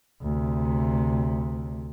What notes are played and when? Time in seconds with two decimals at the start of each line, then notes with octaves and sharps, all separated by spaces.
0.22 D2 C3